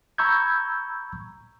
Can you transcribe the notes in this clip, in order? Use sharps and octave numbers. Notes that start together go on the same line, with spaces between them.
A#5 B5 C#6 E6 G6 G#6